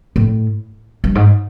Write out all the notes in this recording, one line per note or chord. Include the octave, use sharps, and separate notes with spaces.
A2
G2
G#2